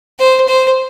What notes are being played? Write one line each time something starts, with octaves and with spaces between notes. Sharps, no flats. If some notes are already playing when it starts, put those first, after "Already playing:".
C5
C5